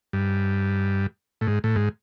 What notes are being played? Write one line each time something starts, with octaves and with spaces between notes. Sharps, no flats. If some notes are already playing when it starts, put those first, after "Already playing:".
G2
A2
G#2
A2
G#2